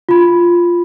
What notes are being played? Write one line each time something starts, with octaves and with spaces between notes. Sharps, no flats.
F4 B5